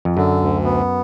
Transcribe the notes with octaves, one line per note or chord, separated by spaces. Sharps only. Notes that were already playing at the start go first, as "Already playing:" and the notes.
F2
F#2 D3
D2
B3